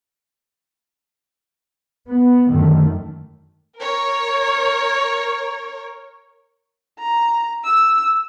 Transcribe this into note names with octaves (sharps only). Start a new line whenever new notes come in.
B3
F#2 D3 D#3 A3
A#4 C#5
A#5
E6